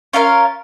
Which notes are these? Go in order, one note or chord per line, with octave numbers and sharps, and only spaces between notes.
C#4 F4 A#4 F5